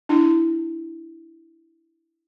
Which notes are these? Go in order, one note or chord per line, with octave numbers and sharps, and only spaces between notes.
D4 E4